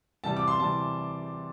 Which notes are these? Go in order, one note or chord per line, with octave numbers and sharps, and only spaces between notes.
C3 E3 G3 A5
D6
C6
C3 E3 G3 A5